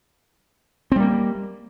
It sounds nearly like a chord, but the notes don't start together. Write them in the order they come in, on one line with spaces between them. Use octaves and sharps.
C4 G3 A#3